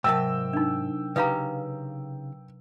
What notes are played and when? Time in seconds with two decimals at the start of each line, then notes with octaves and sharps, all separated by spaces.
0.04 G#2 C3 F#3 A#4 E5 G5 A5 E6
0.53 D4 D#4
1.16 C#3 D#4 G4 B4 F5 A#5